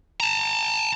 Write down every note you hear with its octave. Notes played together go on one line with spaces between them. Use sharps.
A5 A#5